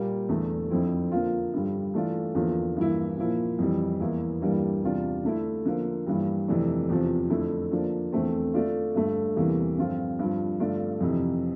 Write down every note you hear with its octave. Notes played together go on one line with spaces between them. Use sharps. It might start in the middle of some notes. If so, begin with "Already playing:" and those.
Already playing: A#2 G3 A#3
E2 D3 A3
F2 D3 F3 C4 E4
D3 F3 A#3 F4
G2 D3 G3
E3 A3 D4 F4
E2 D3 F3 A#3 F4
G2 E3 A#3 E4
A#2 F3 A#3 E4
F2 E3 G3
E2 E3 A#3 E4
G2 E3 G3 A#3 D4
E2 C3 G3 D4 F4
D3 A3 E4
D3 F3 A#3
G2 E3 G3 A#3
F2 C3 E3 A3 D4
E2 C3 F3
F2 D3 A3 E4
D3 F3 A#3 D4
E2 D3 A3 C4
D3 A3 D4 F4
G2 D3 A3
E2 C3 E3 G3 A#3
G2 D3 F3 C4 F4
G2 D3 F3
G2 D3 A3 D4 F4
F2 C3 E3